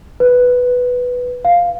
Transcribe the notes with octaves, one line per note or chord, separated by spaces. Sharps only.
B4
F5